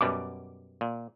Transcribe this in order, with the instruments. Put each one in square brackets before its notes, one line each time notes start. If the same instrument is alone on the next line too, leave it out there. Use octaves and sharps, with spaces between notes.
[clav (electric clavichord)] F#2 B2 G3 [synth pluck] D6
[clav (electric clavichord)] A#2